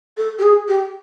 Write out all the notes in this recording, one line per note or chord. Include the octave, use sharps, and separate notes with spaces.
A4
G4
G#4
G4